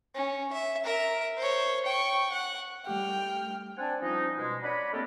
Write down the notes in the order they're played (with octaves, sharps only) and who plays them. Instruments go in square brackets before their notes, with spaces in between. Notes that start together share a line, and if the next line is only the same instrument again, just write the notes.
[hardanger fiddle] C#4
E5
A#4 E5
C5 C#5
G5 C#6
F#5
[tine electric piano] G3 A3 G4 [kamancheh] G5 F6
[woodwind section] C4 D4 D5 F#5 G#5 A5
F3 G3 C#4 D#4
B2 G#3
D4 C#5 D#5 F#5 B5
A3 A#3 C4 G4 A4 A#4